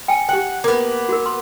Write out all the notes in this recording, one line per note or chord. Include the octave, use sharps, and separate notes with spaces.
G5 G#5
G4 F#5 G5
A#3 B3
F#4 A#4
C6